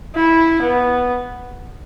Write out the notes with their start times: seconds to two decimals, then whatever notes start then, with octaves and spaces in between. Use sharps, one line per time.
0.15 E4
0.62 B3